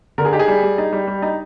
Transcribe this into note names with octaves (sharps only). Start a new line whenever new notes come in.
D3 A#4
G#4
D#4 G4
G#4
G3
G3
D#4
G3
G3
D#4